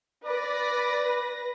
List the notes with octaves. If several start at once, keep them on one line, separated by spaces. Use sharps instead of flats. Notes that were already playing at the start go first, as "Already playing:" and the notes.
B4 D5 A#6